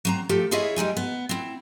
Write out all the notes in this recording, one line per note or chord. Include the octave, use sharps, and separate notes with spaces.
F#3 C4 A#5
F3 A3 G4 A4
E4 F4 G#4 C#5 D#5 E5
G3 G#3 D#4 G#5
B3
C4 E4